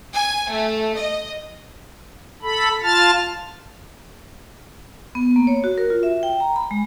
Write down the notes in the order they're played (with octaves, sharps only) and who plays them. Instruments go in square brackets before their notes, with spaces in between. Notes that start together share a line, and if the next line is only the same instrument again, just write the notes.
[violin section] G#5
A3
D#5
[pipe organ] A4 B5
F4 A5 F6 A6
[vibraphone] B3
A#3
C#5
F#4
A#4
F4
E5
G5
A#5
B5
G#3